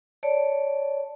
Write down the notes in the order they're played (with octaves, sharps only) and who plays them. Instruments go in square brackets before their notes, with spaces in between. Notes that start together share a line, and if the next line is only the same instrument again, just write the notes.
[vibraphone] C#5 D5 A5